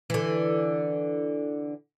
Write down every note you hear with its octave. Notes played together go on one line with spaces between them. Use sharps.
D3 E3